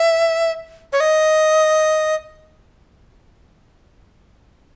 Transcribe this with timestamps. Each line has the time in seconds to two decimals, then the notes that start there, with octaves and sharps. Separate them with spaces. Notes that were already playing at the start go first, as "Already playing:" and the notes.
Already playing: E5
0.92 C#5
1.00 D#5